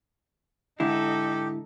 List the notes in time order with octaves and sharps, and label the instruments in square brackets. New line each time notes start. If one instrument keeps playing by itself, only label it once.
[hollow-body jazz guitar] G#2 D3 E4 [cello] D#4 A4 [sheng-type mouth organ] G4